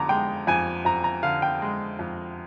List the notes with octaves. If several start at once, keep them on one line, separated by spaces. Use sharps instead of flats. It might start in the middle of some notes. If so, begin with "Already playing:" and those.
Already playing: F2 D3 A#5 D6
G#3 G5
F2 G#5
F2 A#5
A#5
D3 F5
G5
G#3
F2